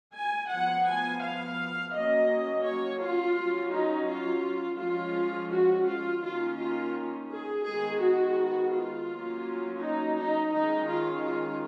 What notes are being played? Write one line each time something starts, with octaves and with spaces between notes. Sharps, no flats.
G#5
F3 B3 F#5
G#5
F5
F#3 A#3 C#4 D#5
C#5
F4
F#3 C#4
D#4
F4
F3 G#3 C#4 F4
F#4
F4
D#3 A#3 C#4 F4
F4
G#4
D#3 G#3 B3 G#4
F#4
F4
F#3 A#3 C#4
D#4
D#4
D#3 G#3 C#4 D#4
F4
F4